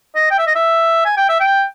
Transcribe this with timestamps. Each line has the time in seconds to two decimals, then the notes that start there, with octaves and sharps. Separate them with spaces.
0.15 D#5
0.31 G5
0.38 E5
0.47 D#5
0.55 E5
1.05 G#5
1.17 G5
1.29 E5
1.40 G5